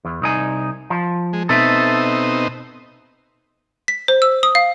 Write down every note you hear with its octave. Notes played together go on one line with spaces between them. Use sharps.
E2
C2 D#4 G#5
F3
G#3
B2 C4 D#4 A4 E5
B6
C5
E6
D#6
F5